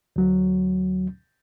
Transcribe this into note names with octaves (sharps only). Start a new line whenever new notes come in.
D2 F#3